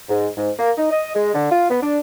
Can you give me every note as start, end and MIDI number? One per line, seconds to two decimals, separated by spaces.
0.09 0.28 44
0.37 0.50 44
0.57 0.71 58
0.78 0.89 63
0.91 1.14 75
1.15 1.32 56
1.34 1.50 50
1.51 1.70 65
1.70 1.82 59
1.82 1.99 62